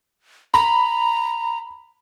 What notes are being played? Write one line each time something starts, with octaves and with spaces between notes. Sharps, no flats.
A#5 B5